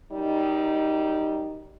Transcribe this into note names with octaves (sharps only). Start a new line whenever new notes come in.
F#2 G3 D#4